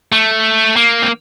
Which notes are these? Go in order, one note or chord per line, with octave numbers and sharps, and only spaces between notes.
A3
A#3
C4